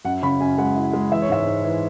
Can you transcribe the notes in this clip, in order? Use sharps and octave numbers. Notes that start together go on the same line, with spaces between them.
F#2 F#5
C#3 B5
F#2 G#5
G#3 F#5
E4
G#3
E3 E5
C#5
G#2 E5
G#2
E3